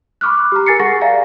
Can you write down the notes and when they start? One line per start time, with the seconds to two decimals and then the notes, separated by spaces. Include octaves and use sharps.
0.21 B5 C#6 D6 F6 F#6
0.52 G4 A#5
0.66 A#4 G#5 A6 C7 C#7
0.80 G#4 F#5 C#6 A6 A#6
1.01 D5 E5 F5 G#5 A#5